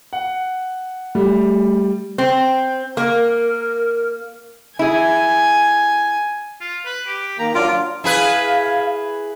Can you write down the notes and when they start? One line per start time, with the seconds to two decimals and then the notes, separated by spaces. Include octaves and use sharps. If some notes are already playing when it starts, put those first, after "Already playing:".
0.13 F#5
1.15 G3 A3
2.18 C4
2.97 A#3 A#4
4.79 E4 G#4 G#5
6.61 F4
6.85 B4
7.07 G4
7.39 D#3 A#3 A#5
7.55 F#3 D4 F4 D6
8.04 E4 G#4 B4 F5